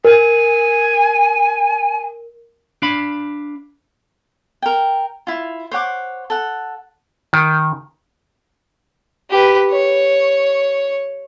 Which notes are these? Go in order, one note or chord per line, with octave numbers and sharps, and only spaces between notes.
A#4 G#5
D4 F5 B5
A#4 G5
E4 F4
C5 C#5 F#5 D6
A4 F#5
D#3
G4 B4
C#5